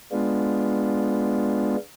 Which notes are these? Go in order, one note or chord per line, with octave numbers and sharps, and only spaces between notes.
G#3 B3 D4 F4